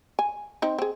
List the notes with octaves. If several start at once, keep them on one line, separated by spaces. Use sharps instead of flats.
G#5
C4 D#4
C4 G#4